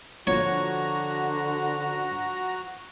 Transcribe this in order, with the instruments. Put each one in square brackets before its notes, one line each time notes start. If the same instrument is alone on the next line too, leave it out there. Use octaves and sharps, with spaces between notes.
[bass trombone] D3 [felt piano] F3 [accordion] F#4 A#5 [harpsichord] C#5